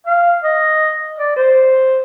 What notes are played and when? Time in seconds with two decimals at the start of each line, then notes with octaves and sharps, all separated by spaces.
0.06 F5
0.44 D#5
1.18 D5
1.36 C5